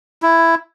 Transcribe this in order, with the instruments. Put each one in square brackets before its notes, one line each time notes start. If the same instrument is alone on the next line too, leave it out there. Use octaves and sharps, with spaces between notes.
[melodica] E4